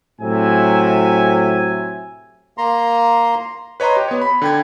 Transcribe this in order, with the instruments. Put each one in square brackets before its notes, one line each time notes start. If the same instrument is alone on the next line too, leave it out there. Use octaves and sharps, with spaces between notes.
[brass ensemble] A2 C3 F#3 E5 G#5
[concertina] A#3 A#5 C6
[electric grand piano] B4 C#5 D#5 A#5 C6
G4
B3 C#5
B5
D3 G5 G#6